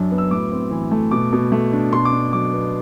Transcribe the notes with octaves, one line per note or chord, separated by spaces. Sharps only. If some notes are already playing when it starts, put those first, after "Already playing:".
Already playing: F#2 F#3 D4
B3
E6
A2 D6
C4
E3
A3
B2 D6
B2
A3
D4
B2 C6
D6
D4
F#3 D6
B3